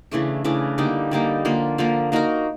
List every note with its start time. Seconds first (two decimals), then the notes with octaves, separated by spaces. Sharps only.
0.11 C#3 E3 A3 D4
0.44 C#3 E3 A3 D4
0.78 D3 G3 A#3 D#4
1.11 D3 G3 A#3 D#4
1.45 D3 F3 A#3
1.78 D3 F3 A#3
2.12 A#3 D#4 F#4 A#4